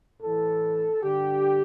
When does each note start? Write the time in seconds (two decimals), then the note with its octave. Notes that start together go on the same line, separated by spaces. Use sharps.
0.21 A2 E3 A4
1.03 G2 D3 G4